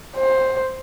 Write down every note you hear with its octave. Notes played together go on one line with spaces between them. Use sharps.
C5